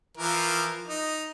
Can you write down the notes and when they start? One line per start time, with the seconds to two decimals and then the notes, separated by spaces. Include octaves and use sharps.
0.17 E3 F3 A#4
0.87 D#4